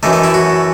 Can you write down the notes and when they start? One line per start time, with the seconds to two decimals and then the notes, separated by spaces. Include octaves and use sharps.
0.03 F#2 E3 A3 D#4
0.13 D#4
0.24 E4
0.34 F#4